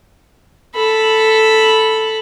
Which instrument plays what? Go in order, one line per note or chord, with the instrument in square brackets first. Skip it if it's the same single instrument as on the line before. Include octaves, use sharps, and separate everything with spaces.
[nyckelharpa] A4 B5